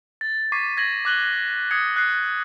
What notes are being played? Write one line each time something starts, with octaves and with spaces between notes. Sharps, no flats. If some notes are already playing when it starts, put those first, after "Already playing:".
A6
C#6 D6 G#6 B6 C7 D#7
G#6 A#6 C7 F#7
D6 F#6 F#7 G7
D#6 E6 G#6 C7 C#7
F#6 C7